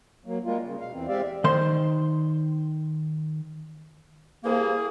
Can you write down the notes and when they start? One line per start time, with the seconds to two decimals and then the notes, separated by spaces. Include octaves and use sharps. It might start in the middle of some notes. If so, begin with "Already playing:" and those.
0.26 F#3 A#3
0.45 G3 G#3 A#3 F4
0.63 C#3
0.80 B2 F5
0.93 E2 E3 C4
1.08 G#3 C4 G4 D5 E5 F5
1.44 D#3 C5 C6
4.44 C2 E3 A#3 G#4